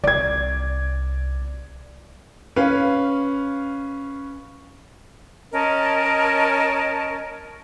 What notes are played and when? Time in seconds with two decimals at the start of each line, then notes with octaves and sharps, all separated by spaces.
0.04 C2 D5 G#6
2.56 C#4 B4 F5
5.52 C#4 A#4 D#5 A5